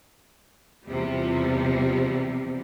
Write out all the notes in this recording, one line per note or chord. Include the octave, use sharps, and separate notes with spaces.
E2 C3 F3 G3